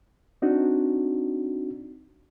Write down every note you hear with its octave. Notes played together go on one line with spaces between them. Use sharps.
C4 D4 D#4 F#4